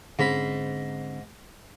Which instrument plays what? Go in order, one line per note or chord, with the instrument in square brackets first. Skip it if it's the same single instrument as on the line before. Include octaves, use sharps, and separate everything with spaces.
[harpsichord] G#2 B5 [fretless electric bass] D3 C4 C#4